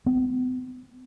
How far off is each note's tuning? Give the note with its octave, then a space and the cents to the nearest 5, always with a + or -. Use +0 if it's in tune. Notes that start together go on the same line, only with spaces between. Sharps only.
B3 +45